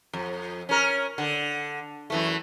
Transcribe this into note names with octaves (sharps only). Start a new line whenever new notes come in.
F2
C#4 A#4
D3
F#2 E3 A3